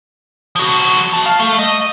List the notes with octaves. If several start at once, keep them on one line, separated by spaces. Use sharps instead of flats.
F3 F#4
F#4 A5
F5
A3
D#5